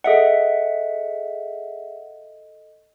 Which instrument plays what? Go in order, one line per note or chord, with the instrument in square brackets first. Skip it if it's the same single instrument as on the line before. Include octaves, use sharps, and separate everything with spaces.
[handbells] G#4 E5 F#5 [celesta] A4 D#5